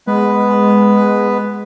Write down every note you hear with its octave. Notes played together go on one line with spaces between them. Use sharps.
G#3 B3 B4